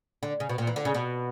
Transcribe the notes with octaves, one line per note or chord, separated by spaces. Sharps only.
D3
C#3
B2
A#2
E3
D3
C#3
B2